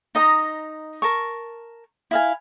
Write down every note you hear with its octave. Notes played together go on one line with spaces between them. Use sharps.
D#4 D#5 A#5
A#4 A5 C#6
E4 F5 G#5